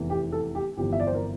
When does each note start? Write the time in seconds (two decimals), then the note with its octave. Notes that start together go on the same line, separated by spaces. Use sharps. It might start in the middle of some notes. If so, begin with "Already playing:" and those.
Already playing: F1 E2 E3
0.10 G4
0.32 A4
0.55 G4
0.77 G1 F2 E3 G4
0.92 E5
1.00 D5
1.07 C5
1.15 A#4